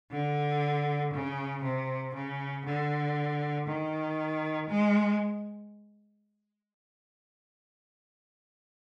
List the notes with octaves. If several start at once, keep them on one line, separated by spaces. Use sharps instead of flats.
D3
C#3
C3
C#3
D3
D#3
G#3